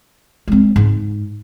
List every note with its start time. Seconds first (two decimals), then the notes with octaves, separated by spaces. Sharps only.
0.48 G#3 C4
0.76 G#2